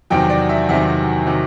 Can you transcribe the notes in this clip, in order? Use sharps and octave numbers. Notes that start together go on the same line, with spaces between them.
E2 C3 D#3 F#3 G5
D5
E5
E2 C3 D#3 F#3 E5
C3 D#3 F#3